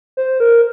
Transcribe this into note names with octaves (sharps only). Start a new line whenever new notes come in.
C5
A#4